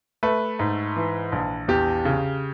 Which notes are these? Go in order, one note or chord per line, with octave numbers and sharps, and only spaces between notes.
A3 B4
G#2
E3
A#1
E2 G4
C#3